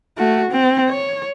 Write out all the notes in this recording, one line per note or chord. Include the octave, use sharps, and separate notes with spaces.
A3 F#4
C4
C#5